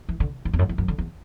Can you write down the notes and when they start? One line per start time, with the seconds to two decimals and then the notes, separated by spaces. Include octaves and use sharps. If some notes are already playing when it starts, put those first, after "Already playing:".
0.09 E3
0.20 D3
0.45 F#2
0.53 E2
0.59 F#2
0.69 E2
0.78 F#2
0.88 D3
0.98 E2